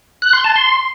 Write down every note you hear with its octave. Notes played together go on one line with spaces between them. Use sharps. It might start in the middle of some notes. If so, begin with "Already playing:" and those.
F#6
C6
A5
C6